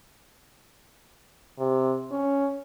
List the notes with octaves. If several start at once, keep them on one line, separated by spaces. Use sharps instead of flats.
C3
C#4